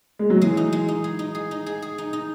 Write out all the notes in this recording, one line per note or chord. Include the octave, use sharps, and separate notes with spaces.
G#3
F#3
E3 G#3
D#4
G#3
D#4
G#4
D#4
G#4
D#4
G#4
G#4
D#4
D#4